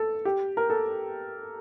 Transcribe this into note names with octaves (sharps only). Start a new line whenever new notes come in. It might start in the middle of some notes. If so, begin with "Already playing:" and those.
Already playing: A4
G4
A#4
A4